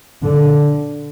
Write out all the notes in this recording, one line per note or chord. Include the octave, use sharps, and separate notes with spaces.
D3